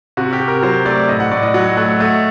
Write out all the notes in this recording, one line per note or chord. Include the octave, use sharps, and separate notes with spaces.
C3 F#4
G4
C3
A#4
F#3 C5
A3 D5
A2 D#5
F#5
A2 D5
D#5
F#3 F#5
A3 F#5
A3 D#5